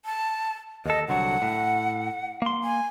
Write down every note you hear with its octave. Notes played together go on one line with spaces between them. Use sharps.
A5
D#2 A4 D#5
C2 D3 F#3 F#5
A2
A#3 C6
G#5